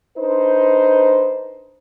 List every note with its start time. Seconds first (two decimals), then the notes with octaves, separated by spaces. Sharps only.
0.18 D4 D#4 B4 C5